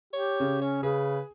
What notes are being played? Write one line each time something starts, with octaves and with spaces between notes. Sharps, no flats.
G4 C#5
C#3
C#4 C#5
C#3 G#4 B4